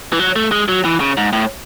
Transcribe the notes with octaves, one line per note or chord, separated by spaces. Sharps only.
E3
F#3
A3
G#3
F#3
E3
C#3
G#2
A2